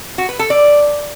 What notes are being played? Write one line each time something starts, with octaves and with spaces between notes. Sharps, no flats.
F#4
B4
A4
D5